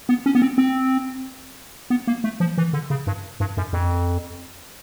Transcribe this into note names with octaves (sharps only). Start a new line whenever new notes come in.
B3
C#4
B3
C4
C4
B3
A#3
A3
F3
E3
D3
C#3
G2
G2
F#2
F2